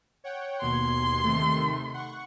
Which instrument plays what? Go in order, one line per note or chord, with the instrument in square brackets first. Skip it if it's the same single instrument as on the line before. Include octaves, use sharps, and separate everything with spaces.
[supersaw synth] C#5 F#5 G5
[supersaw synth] D#2 B2 G#6 [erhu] C6
[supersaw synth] C3 D#3 A3
F#5 C#6